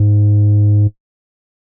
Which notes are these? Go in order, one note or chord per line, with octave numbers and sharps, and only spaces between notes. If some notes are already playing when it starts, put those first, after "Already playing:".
Already playing: G#2